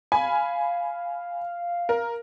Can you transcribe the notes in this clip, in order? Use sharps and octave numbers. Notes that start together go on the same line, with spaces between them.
F5 G#5 B5
A#4